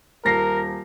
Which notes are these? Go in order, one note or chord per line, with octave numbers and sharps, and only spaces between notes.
D#1 A#4 A#6 C7